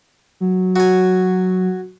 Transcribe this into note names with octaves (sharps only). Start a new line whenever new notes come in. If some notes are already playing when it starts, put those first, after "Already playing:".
F#3
F#4 G#5